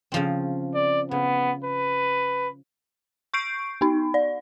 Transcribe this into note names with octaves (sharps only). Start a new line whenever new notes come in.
C#3 F3 C4
D5
C#3 B3
B4
C#6 G6 C7 D7
B3 D#4
D5